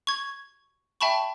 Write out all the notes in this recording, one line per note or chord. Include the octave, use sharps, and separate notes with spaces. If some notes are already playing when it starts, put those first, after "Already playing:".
C#6 G#6
E5 G5 A5 B5 C#6